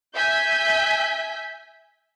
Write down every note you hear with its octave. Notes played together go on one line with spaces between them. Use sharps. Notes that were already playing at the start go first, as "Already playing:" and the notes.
E5 G#5 G6 B6